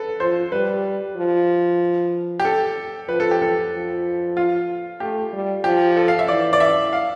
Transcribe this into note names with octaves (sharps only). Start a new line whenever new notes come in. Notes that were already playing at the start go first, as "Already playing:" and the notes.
Already playing: A4 B4
F3 C5
G3 B4
F3
G4
A4
F3 B4
A4
G4
A4
F3
F4
A3 G4
G3
F3 G4
A4
F5
E5
E3 D5
D5
E5
F5